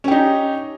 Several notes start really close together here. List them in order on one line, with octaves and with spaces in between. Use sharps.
C#4 G4 D#4